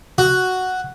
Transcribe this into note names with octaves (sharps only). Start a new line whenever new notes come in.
F#4